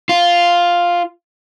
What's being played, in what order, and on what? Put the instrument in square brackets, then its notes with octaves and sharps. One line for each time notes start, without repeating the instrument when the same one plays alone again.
[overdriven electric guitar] F4